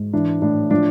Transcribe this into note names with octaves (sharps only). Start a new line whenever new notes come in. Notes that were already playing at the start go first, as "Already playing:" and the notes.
Already playing: G#2
E3 D4
A2 D4
F3 D4